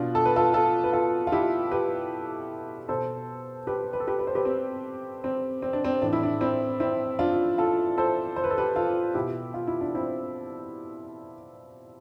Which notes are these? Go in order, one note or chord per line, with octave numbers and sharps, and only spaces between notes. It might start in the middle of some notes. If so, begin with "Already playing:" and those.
Already playing: B2 D4 F4
A4
B4
F4 A4
F4 A4
B4
F4 A4
F4
E4 G4
G4 B4
B2 A4 C5
G4 B4
B4
A4
G4 B4
B4
C5
G4 B4
C4
C4
C4
D4
C4
A2 E3 D4
E4
D4
C4 E4
C4 E4
D4 F4
F4 A4
A4 C5
C5
B4
A4
G4 B4
F4 A4
B2 E4 G4
F4
E4
D4
C4 E4